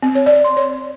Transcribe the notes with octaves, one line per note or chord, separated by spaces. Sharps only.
C4
C#5
D5
C6
C#5